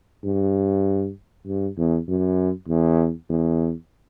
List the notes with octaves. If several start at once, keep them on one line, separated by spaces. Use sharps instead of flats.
G2
G2
E2
F#2
E2
E2